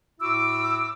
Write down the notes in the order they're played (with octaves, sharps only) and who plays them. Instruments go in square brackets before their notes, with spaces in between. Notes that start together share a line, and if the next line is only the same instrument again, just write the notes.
[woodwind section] A2 E4 F#4 D6 E6